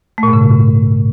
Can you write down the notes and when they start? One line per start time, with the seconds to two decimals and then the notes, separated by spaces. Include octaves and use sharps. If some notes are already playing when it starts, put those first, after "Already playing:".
0.18 A3
0.23 A#2
0.28 G#2
0.33 C#3